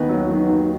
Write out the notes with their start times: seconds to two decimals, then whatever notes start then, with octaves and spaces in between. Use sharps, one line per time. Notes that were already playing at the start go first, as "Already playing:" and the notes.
Already playing: D#2 B3 D#4
0.09 F#3
0.29 D#3
0.50 D#2